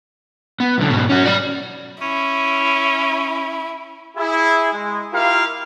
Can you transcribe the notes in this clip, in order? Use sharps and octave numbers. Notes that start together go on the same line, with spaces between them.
B3
B1 D3
G#2 B2
C#4 F#4
D5 B5
C#4 E4
E4 G#4
G#3
E4 F4 G4 A#4 E5 F5